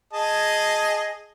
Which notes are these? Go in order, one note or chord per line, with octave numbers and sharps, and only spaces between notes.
G#4 D#5 A5